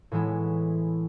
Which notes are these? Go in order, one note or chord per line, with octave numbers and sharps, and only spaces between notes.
A2 E3 G#3 B3 E4